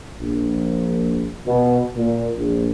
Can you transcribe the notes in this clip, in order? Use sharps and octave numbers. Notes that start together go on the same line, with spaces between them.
A#1
B2
A#2
A#1